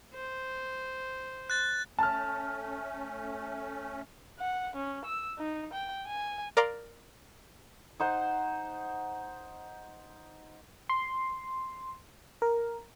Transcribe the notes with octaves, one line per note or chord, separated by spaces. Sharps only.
C5
F#6 A6
A3 C#4 A5 F6
F#5
C#4
E6
D#4
G5
G#5
A#4 D5 F5 A#5 C6
D#4 C5 F#5
C6
A#4